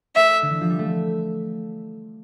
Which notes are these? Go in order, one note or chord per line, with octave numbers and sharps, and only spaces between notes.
A3 E5
D3
E3
F3
G3
A3